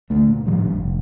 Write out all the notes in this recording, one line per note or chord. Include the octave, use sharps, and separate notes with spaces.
D2 A3
A#2
A2 D#3 F3 G3
A#1 G2
F1